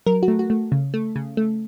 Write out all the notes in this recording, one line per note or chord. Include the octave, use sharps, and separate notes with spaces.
F#3 A#4
F#4
A3
F#4
A3
C#3
A3
C#3
A3